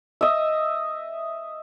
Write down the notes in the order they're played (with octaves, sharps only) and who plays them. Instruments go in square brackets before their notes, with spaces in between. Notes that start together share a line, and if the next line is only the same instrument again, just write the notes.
[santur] D#5 E5